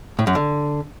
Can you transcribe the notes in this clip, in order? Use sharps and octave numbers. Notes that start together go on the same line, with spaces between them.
A2
F#2
D3